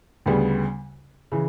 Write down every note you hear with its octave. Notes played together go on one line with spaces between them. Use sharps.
D2 C#3 G3 B3
C#3 E3